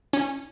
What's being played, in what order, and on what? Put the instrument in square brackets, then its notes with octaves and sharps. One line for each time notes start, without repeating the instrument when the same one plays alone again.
[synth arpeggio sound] C#4